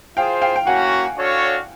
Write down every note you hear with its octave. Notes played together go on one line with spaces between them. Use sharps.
F4 G#4 C5 F5 G5
F5 G5
G5
A#3 C#4 F#4 F#5 G#5
D4 F#4 A4 C#5 F5